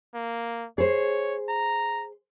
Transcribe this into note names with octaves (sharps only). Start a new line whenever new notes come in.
A#3
G#4 C5 C#5
A#5